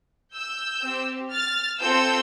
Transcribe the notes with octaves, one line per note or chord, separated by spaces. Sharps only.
E6 G6
C4 G4
F6 A6
C4 F4 A4 E6 G6